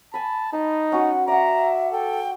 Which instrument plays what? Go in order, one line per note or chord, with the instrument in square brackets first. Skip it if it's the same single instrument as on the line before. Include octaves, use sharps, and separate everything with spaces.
[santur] G#5 B5 [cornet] A5
[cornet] D#4 [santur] A5
[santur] C#4 F#4 [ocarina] F#5
[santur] D5 F#5 [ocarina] E5 [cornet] A#5
[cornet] A4 [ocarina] G5